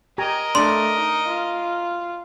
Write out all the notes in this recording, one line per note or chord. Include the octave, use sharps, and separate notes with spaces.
G4 A#4 D#5 G#5 A#5
A3 D4 D5 C6
D#4
F4